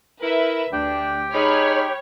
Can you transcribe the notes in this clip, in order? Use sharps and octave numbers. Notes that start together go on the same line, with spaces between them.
E4 A#4 B4 E5
D2 D4 G4 G5
D#4 G#4 C#5 B5 F6